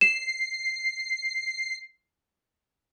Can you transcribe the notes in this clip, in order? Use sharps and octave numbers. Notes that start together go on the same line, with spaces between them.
C7 E7